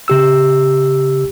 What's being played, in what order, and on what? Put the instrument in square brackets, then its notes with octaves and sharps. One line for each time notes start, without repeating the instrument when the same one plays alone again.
[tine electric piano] C#3 G4 E6